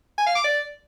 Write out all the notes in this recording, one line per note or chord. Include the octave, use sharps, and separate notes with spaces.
G#5
F5
D6
D5